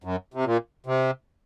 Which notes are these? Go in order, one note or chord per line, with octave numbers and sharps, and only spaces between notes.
F#2
C3
A#2
C3